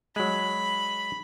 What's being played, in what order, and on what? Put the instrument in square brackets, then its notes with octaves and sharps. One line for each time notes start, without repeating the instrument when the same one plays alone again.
[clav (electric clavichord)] F#3 G#3 [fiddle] B5